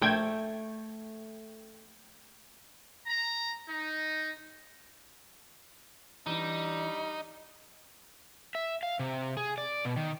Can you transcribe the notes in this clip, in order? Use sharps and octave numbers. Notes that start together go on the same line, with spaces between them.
A#1 A3 G5 G#6
A#5
D#4
E3 G3 D4 D#4
E5
F5
C3
G#4
D5
B2
D#3